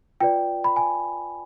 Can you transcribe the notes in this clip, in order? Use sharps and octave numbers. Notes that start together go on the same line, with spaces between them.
F4 B4 D5 G5
B5
G#5